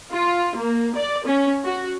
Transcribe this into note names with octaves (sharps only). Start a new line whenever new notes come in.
F4
A#3
D5
C#4
F#4